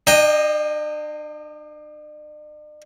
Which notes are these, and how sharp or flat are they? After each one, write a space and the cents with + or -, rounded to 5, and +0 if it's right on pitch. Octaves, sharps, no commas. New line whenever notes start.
D4 +45 D#5 +0 G5 +25